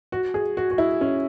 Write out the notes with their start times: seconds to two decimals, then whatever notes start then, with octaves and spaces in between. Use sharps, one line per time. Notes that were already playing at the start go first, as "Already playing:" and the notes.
0.12 F#4
0.34 G#4
0.57 F#4
0.71 F#4
0.78 E4
1.01 C#4